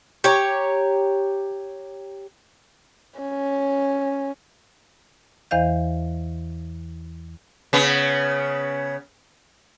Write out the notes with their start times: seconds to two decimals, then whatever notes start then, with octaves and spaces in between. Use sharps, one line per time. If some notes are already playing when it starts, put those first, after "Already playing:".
0.24 G4 C#5 A#5
3.20 C#4
5.51 E2 E3 C5 D#5 F5 G6
7.73 C#3 B3